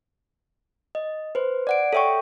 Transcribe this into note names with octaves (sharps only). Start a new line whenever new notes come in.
D#5
B4 C5
D5 F#5 D7
A4 C#5 E5 G5 C#6